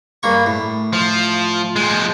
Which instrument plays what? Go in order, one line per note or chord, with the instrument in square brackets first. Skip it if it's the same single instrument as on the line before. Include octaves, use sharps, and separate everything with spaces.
[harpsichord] G2 A#3 C#6
A2
[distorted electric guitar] F3
F3 G#3